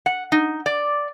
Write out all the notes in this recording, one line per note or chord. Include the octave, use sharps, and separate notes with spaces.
F#5
D#4
D5